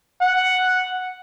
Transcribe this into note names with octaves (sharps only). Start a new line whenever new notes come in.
F#5